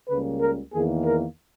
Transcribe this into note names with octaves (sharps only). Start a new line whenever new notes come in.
C#2 C#3 G3 A#3 B4
A#4
E2 D#3 A#3 G#4
A#4